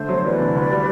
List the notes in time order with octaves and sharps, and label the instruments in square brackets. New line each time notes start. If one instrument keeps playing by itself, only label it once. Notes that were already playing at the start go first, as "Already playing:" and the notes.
Already playing: [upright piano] D3 A3 [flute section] C5
[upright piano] F#3
[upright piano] E2 [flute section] B4 D5
[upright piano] D3
D2
G3